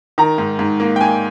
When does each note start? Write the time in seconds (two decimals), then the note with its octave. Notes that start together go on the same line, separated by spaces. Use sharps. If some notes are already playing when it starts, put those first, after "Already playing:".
0.18 D#3 A#5
0.38 G#2
0.59 G#2
0.80 A#3
0.96 G5
1.01 A#3 G#5